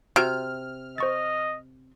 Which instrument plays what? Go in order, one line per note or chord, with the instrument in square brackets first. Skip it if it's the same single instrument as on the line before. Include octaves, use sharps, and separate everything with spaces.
[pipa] C3 [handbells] F#4 E6 G#6 [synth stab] F6
[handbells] C5 C#6 A6 [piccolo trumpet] D#5